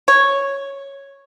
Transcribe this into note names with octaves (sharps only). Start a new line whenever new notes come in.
C#5